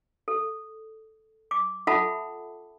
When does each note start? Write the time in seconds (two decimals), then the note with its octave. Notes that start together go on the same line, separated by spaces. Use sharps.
0.28 A4
1.51 D6
1.87 F4 A4 E5 F#5 A5 B5